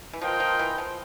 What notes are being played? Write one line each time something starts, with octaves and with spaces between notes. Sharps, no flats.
E3
F3 F4 A#4 D#5 G5
F3
E3
F3